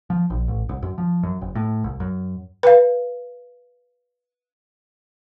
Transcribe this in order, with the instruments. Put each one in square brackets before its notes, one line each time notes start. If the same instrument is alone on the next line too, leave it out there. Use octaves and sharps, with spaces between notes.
[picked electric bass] F3
A#1
A1
C2
F#2
F3
F#2
F#1
A2
C2
F#2
[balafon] B4 F5